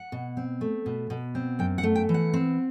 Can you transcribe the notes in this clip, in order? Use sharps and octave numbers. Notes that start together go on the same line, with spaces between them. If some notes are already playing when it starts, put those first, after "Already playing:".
Already playing: F#5
B2
C4
A3
B2
B2
C4
F#2 G5
F#5
A3
G5
E3
F#5
C4